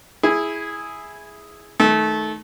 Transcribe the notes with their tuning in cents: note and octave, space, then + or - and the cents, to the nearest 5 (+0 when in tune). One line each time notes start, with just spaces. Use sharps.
E4 -5 G#4 +0
D#3 +0 A3 -25